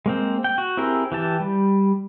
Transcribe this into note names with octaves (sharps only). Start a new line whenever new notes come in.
G#3 A#3 C4
G5
F#4
C4 E4 G4 G#4 A#4
E3 G4 A5
G3